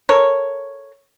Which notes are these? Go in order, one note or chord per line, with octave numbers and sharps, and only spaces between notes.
A4 A#4 C#5